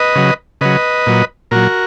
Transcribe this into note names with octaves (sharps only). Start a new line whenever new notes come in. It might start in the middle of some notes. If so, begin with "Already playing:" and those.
Already playing: B4 D#5
C#3 F#3
C#3 F#3 B4 D#5
A#2 F#3
A#2 F#3 F#4 A#4